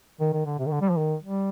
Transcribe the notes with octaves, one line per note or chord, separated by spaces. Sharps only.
D#3
D#3
D3
C3
D#3
D3
G3
F3
D#3
G3